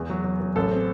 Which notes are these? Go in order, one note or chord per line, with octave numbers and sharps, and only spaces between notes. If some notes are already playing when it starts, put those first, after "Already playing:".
Already playing: E2 G#4
F#3
F#3
F#3
A1 A4
C4